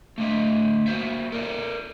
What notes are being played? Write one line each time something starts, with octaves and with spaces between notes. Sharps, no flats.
A3 D4 D#5 E5
A#3 F#4 C5 E5
A4 A#4 D5 E5